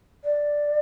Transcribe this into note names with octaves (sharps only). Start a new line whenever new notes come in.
D5